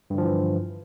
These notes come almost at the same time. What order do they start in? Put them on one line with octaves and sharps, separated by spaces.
G2 D3 F3 E3